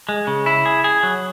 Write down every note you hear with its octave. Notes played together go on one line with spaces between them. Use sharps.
G#3
C#3
E4
G#4
G#4
F#3